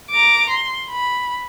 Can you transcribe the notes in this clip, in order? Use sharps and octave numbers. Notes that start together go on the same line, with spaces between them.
A#5 D6
C6
B5